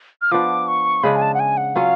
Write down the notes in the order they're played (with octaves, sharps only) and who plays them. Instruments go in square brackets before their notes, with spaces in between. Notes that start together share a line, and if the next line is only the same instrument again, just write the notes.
[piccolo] F6
[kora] F3 B3 D4 [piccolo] D6
[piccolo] C#6
[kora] C#3 G#3 D4 [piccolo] B5
[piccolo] G#5
A5
F#5
G#5
F#5
[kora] F#3 C#4 F4 [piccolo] F5